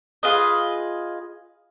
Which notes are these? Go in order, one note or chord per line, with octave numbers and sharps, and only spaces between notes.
F4 G#4 B4 D#5